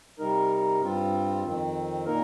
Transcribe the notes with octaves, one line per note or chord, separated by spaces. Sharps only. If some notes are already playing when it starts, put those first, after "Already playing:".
C3 G3 D#4 A#4
G2 G3 C4 F4
F2 D#3 C4
A#2 A#3 D#4 A#4